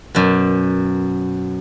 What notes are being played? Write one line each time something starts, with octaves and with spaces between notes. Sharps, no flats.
F#2 B2